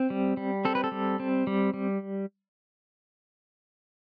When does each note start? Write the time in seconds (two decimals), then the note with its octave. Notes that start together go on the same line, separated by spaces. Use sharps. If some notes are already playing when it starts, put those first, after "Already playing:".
Already playing: C4
0.10 G3
0.37 G3
0.65 C4 A4
0.75 B4
0.84 A4
0.92 G3
1.20 C4
1.47 G3
1.74 G3